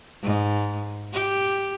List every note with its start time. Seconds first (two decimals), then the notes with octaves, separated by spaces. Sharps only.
0.23 G#2
1.13 G4